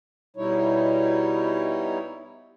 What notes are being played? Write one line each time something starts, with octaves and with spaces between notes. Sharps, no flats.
B2 G3 D#4 E4 C#5